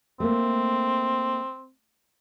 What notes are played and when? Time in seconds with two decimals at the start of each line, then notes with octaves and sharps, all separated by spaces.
0.20 A3 A#3 C4